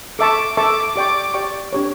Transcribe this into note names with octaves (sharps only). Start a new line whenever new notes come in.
A4 E5 A5 C#6 D6
A4 E5 A5 C#6 D6
G4 D5 G5 C#6 D6
G4 D5 G5 C#6
D4 G4 C#5